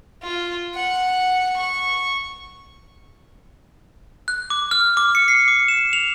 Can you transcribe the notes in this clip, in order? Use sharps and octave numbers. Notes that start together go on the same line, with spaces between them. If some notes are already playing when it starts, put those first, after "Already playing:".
F4
F#5
C#6
F#6
D6
F6
D6
C#7
C7
D6
E7
F7